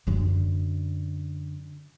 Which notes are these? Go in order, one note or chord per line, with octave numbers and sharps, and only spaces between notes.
F#2 D3